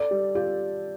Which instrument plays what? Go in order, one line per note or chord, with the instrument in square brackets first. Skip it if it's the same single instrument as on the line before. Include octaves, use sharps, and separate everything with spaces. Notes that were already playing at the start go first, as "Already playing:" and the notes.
Already playing: [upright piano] A4 [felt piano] D5
[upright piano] G3
[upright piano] F4 [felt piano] G4